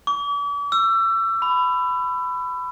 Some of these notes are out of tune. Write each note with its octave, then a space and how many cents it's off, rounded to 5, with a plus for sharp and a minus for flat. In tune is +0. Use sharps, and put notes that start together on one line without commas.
D6 -45
E6 +30
B5 +15